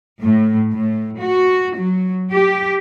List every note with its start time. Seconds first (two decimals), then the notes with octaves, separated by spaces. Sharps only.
0.22 A2
0.72 A2
1.20 F#4
1.77 F#3
2.31 G4